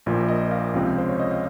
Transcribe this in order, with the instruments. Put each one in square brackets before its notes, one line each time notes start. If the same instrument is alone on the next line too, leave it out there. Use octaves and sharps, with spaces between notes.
[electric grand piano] A#1 A#2 F3 A#3
D#5
F5
C#2 C3 F3 C4
C5
C#5
D#5
F5